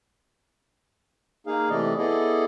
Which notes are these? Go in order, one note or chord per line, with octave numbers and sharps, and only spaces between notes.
A#3 D#4 G#4 F5
C3 E3 A3 D5 D#5
B3 E4 G#4 A4 D5 D#5